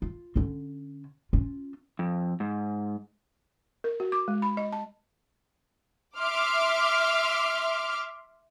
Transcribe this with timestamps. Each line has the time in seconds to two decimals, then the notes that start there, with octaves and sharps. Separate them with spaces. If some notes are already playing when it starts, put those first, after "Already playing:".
0.02 F4
0.36 D3 C#4
1.33 C#4 F4
1.99 F2
2.40 G#2
3.84 A#4
4.00 F#4
4.12 D6
4.28 G#3
4.42 B5
4.57 D#5
4.73 A5
6.18 E5 C6 D6 F6